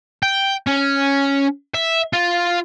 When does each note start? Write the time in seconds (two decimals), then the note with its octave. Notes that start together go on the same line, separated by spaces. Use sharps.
0.23 G5
0.67 C#4
1.74 E5
2.13 F4